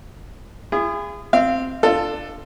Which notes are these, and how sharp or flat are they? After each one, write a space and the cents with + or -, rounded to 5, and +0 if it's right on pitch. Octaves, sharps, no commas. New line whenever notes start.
E4 +40 G#4 -25
C4 +0 F5 -25
D4 +25 F4 +0 A4 +10